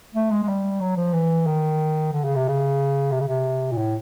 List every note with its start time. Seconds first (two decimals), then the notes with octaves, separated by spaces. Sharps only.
0.15 A3
0.31 G#3
0.43 G#3
0.48 G3
0.80 F#3
0.97 F3
1.13 E3
1.46 D#3
2.12 D3
2.24 C#3
2.36 C3
2.48 C#3
3.12 C3
3.20 C#3
3.28 C3
3.71 A#2
3.78 A2